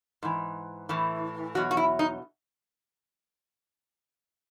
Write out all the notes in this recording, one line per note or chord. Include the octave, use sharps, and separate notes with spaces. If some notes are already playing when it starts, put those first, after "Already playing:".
G#2 E3
A2 E3
E2 B2 F#3 F#4
F#4
E4
D#4